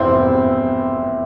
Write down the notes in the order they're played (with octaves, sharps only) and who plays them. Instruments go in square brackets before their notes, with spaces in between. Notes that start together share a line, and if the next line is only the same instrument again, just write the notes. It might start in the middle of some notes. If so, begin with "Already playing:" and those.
Already playing: [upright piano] F1 E2 C3 C4 E4